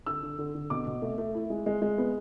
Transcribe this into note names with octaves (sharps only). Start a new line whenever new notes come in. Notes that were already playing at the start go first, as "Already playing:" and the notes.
D3 E6
D3
D3
D3
B2 D6
B2
A3
A3
E4
G#3
G#3
G#3
B3